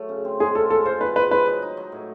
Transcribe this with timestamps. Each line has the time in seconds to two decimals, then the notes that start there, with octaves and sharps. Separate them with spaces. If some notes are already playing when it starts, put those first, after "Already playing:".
Already playing: F#3 A3
0.09 C#3
0.25 C4
0.40 G#3 G#4
0.55 F4 A4
0.70 G#3 A4
0.86 F4 C5
1.01 F3 B4
1.16 G#3 B4
1.31 F#3 B4
1.47 D#4
1.62 D#4
1.77 F#3
1.92 A2